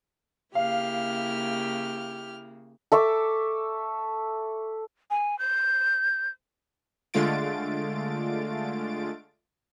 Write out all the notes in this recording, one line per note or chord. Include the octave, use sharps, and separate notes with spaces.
C#3 A#3 E4 G4 F5 F6
A4 E5 C#6 D6
G#5
G6
D3 G#3 A3 F4 A6 D7